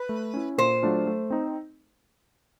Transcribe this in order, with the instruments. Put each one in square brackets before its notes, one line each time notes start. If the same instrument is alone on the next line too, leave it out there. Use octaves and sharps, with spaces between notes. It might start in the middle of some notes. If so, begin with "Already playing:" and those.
Already playing: [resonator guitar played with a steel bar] B4
[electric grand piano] A3
C#4 E4
[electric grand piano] A#2 [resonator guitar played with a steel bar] C5
[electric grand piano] F#3 A3 D4 F4
A3
C4 D#4